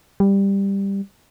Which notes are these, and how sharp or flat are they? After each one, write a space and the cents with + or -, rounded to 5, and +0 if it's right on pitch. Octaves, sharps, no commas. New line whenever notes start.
G3 +10